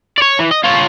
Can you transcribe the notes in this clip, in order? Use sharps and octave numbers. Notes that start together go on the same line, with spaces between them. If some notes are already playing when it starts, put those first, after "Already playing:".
C#5 D5
E3
D#5
F4 C#5